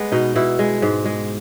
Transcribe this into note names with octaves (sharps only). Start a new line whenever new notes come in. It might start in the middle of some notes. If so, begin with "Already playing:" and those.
Already playing: G#3 B3
B2 D#4
B2 E4
G#3
G#2
G#3